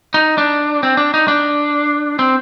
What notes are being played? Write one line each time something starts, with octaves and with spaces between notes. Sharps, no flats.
D#4
D4
C4
D4
D#4
D4
C4